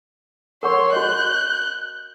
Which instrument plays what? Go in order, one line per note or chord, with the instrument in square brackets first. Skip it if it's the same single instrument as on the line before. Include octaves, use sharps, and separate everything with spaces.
[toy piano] A#4 F#5 C#6 [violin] C#5 C6
[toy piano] F#4 D#5 [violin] F#6 G6